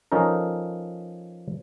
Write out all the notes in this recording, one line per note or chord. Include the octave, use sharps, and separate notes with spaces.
F3 C#4 D#4 A4 A#4